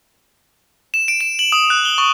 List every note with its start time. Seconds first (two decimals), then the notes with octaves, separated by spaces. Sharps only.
0.94 E7
1.08 D7
1.21 E7
1.39 F#7
1.52 D#6
1.70 F#6
1.85 G7
1.98 C#6